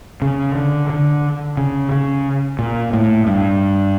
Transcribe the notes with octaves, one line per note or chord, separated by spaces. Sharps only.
C#3
D3
D3
C#3
C#3
A#2
A2
G2